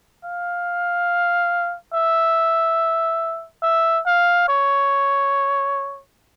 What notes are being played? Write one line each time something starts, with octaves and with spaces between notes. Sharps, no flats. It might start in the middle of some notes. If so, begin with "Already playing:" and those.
F5
E5
E5
F5
C#5